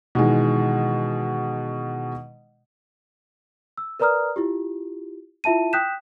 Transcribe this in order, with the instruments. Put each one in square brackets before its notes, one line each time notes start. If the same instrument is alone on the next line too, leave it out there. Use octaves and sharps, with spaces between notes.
[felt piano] B2 D#3 E3 G#3
[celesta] E6
A#4 B4 D5 A#5 D#6 F6
E4 F4 G4
E4 F4 E5 A5 D#7
G5 D#6 F#6 G6 B6 E7